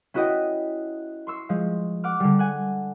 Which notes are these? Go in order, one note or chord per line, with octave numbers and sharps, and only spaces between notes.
C#4 E4 F#4 B4 D#5 G5
C6 C#6 E6 C7
F3 G#3
F#5 D6 F6
D3 G3
F#5 G#5